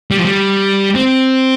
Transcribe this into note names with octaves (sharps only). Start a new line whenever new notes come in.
G3
F3
G3
C4